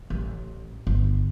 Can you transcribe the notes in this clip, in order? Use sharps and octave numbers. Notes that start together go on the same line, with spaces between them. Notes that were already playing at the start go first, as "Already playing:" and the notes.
A1
G1